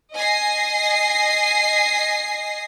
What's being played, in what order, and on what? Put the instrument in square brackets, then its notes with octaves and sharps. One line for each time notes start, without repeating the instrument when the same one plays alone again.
[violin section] D#5 G#5 A#6 C7